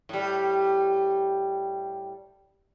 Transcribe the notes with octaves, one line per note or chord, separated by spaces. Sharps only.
A2 G3